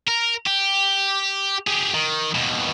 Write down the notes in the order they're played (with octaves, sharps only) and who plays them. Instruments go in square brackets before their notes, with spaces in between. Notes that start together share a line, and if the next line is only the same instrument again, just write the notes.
[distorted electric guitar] A#4
G4
G4 G#4
D#3
D#2 B2